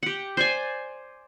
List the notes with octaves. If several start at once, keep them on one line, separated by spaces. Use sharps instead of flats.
G4 F#5
C5 D5 G#5